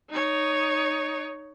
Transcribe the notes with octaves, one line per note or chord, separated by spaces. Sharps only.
D#4 C#5